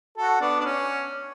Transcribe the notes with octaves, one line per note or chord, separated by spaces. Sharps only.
F#4 A4
B3 D4
D4
C#4